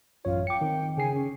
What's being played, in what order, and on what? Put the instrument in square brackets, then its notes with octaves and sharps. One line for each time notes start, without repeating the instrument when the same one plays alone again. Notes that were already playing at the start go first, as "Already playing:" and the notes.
[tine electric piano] A1 F#2 C#5 [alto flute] F4
[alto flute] G5 [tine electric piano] D6 C#7
[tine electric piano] D#3 C4
[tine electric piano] C#3 G#4 C7 [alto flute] G#5
[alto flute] C#4